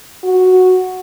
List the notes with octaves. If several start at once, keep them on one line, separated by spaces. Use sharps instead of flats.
F#4